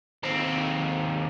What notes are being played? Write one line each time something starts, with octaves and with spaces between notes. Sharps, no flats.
D#2 C4